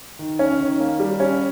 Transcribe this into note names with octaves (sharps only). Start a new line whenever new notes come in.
D#3
C#4
D#3
A#3
G3
C#4